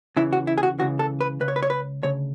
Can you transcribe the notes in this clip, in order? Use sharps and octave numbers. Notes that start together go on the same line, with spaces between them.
E2 C#3 E3 E4
F#4
E4
G#4
F#4
C#2 C#3 E3 F#4
A4
B4
C#2 C#3 B4
C#5
B4
C#5
B4
D2 C#3 C#5